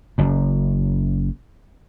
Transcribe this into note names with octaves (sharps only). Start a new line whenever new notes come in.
F#1 F#2